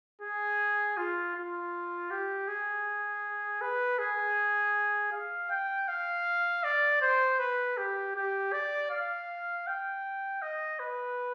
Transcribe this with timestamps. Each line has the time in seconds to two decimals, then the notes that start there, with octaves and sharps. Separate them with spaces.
0.21 G#4
0.97 F4
1.35 F4
2.11 G4
2.48 G#4
3.61 B4
3.99 G#4
5.12 F5
5.50 G5
5.88 F5
6.64 D5
7.01 C5
7.39 B4
7.77 G4
8.16 G4
8.52 D5
8.91 F5
9.67 G5
10.42 D#5
10.79 B4